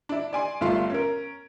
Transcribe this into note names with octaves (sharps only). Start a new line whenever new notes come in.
D4 E4
D5 G#5 C6
G1 G2 A3 F4 F5 C6
C#4 A#4